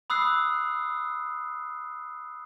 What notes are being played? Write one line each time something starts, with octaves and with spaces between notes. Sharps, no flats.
B5 D#6 E6 F#6 C7